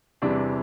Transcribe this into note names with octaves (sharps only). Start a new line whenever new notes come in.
E2 C3 E3 G3 D4